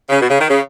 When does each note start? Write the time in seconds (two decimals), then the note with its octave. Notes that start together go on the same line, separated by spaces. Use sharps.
0.09 C#3
0.20 B2
0.29 C#3
0.40 D#3
0.49 C#3